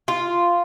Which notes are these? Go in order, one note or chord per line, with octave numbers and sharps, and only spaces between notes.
F4